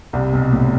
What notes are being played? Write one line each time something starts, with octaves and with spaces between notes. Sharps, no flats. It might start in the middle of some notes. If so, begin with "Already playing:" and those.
C2 C3
B1 B2
A2